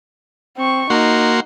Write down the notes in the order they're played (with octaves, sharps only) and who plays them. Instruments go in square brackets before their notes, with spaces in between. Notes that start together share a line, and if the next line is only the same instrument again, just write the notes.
[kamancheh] C4 C#6
[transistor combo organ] A#3 F#4 C6 [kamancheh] D#4